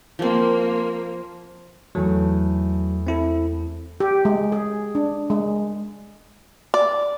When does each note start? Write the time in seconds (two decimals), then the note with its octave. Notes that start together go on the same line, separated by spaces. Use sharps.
0.19 F3 A#3 C4
1.95 E2 F#3 A3
3.07 C4 E4 A4
4.00 G4
4.25 G#3
4.52 G#4
4.95 D4
5.30 G#3
6.74 D5